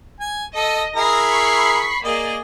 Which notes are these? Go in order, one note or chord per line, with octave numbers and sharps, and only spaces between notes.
G#5
A4 D#5
E4 G#4 A#4 A#6 C7
B5 C#6 C7
A#3 G#4 D5 D#5